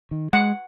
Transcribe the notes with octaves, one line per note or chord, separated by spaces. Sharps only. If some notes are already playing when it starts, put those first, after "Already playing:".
D#3
G#3 F#5